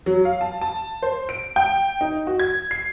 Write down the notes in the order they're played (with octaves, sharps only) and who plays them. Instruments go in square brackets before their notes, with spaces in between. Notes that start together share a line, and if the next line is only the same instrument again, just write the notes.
[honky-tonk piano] F#3
F5
A5
A5
C5
D7
G5
D#4
F#4
G#6
C7